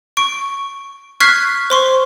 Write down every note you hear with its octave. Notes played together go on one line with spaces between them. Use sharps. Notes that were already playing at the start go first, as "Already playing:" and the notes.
C#6 D7
C#6 F6 F#6 G#6 B6 C7
C5 C6 C#6